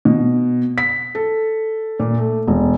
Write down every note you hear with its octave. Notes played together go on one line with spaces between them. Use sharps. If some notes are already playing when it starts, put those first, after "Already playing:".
B2
B6
A4
A#2
A3
E1